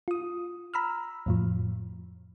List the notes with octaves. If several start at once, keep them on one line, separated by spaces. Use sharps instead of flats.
F4 D#6
A#5 B5 E6 F6
F2 A2 F3